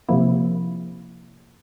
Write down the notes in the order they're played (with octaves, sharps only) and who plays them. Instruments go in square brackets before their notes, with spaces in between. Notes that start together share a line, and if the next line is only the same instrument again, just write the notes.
[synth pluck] C3 F3 A#3 E4